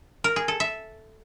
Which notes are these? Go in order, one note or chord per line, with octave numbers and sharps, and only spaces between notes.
A#4
G#4
A4
E5